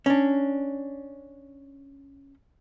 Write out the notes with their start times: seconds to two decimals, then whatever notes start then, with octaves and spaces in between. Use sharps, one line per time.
0.06 C#4 D4